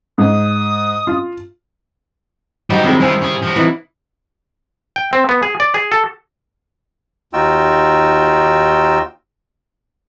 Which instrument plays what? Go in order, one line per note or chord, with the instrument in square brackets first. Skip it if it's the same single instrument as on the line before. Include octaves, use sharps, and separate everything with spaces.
[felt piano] G#2 [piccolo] D#6
[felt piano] F4
[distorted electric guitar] F#3 C5 [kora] G3 G5 [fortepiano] D#4 F#4 D#5
[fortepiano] C3 G#3 [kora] D#3 E4
[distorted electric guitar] G#3 F4 [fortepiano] C5 G#5 E6
[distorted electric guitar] C#4 G#4
F3 F#4
[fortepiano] C3 D#4 E4 [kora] E3
[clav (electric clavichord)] G5
C4
B3
G#4
D5
G#4
A4
[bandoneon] D#2 D#4 F4 F#4 G5 E6